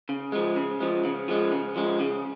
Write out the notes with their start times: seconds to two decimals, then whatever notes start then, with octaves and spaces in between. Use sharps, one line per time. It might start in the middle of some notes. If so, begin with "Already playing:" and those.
0.09 C#3
0.32 F3 G#3
0.56 C#3
0.80 F3 G#3
1.05 C#3
1.28 F3 G#3
1.52 C#3
1.76 F3 G#3
2.00 C#3